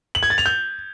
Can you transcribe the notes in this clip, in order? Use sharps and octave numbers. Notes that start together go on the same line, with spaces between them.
F#7
G#6
A6
F7
G6